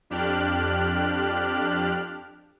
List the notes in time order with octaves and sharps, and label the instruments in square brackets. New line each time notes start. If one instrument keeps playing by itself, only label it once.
[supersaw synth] F2 D4 G4 F6 F#6